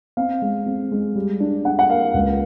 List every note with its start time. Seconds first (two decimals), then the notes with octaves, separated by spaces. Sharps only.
0.17 C4 F5
0.42 G#3
0.66 C4
0.91 G#3
1.16 G3
1.40 D4
1.65 D4 F#5
1.79 F#5
1.90 A#3 F5
2.14 C#2